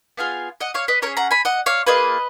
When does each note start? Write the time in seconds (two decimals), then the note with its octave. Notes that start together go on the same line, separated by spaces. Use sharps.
0.17 B3 F4 G#4 F5 G#5
0.61 D#5 F#5
0.74 C#5 F5
0.88 B4 D#5
1.02 C#4 A#4 C#5
1.07 G#4
1.17 F#5 A#5
1.31 G#5 B5
1.45 D#5 F#5
1.66 C#5 F5
1.87 A#3 F4 G#4 B4 D#5